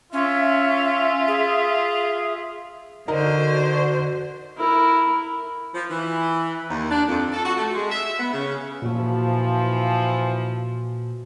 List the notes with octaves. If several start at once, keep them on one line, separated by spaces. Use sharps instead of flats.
C#4 F4 E5
G#4
D3 D#4 F#4 A#4 C5 D#5
E4 A#4
F3
E3
D#2
D4
F2
A4
F#4
A3
G#3
E5
B3
C#3
A#2 E3 F3 F#4